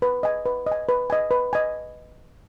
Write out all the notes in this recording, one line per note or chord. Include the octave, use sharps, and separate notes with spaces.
B4
D#5 G#5
B4
D#5
G#5
B4
D#5 G#5
B4
D#5 G#5